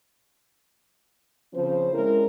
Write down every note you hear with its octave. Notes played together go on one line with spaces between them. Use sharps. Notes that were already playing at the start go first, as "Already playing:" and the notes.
C#3 F3 C4 C#4 C5
G#3 C4 C#4 E4 A#4